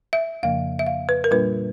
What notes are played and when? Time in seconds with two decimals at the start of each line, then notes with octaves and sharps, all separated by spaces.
0.13 E5
0.43 F2 C#3 F3 A#3 F5
0.79 E5
0.87 F5
1.09 B4
1.24 A#4
1.31 A#2 G3 A#3 D4 F4 B4